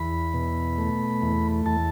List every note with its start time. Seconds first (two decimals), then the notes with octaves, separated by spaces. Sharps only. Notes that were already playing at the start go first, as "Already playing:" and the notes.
Already playing: E2 B5
0.34 B2
0.78 A3
1.22 E2
1.66 E2 A5